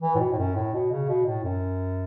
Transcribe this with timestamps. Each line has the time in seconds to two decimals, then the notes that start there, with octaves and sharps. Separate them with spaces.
0.02 E3
0.15 A2
0.19 B2
0.32 A2
0.38 F#2
0.55 A2
0.73 B2
0.91 C#3
1.09 B2
1.26 A2
1.44 F#2